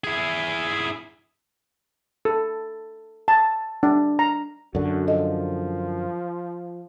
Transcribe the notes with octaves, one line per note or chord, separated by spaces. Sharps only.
E4 G#4
A4
A5
D4
A#5
F#2 D3 F#4
F3 A4 D#5